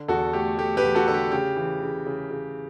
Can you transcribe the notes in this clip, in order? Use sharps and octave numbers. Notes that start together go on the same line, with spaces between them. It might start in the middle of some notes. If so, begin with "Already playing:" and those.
Already playing: D3
E2 F#4 A4
A3 G4
A3 G4
G4 B4
E2
F#4 A4
D3 A4
G4
C#3 G4
E3
C#3
C#3
C#3